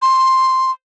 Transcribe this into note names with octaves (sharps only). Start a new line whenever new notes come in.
C6